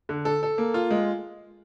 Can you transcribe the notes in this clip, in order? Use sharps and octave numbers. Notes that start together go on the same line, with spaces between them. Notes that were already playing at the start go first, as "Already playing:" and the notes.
D3
A4
A4
A#3
F4
G#3